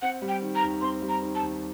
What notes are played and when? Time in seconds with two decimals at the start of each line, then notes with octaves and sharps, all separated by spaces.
0.02 C4 F#5
0.22 G3
0.28 G5
0.42 D#3
0.55 A#5
0.62 D#2
0.81 C4 C6
1.02 G3
1.09 A#5
1.22 D#3
1.35 A5
1.42 D#2